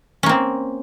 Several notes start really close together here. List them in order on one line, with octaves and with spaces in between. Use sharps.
C#4 A#3 C4